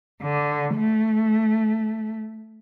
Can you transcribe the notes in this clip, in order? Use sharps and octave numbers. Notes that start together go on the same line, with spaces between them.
D3
A3